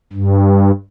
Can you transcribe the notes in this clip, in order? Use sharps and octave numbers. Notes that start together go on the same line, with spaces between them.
G2